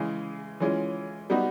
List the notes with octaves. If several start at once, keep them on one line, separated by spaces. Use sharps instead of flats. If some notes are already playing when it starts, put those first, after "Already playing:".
Already playing: C#3 E3 G#3
E3 G#3 C#4 F4
G3 B3 D#4 F#4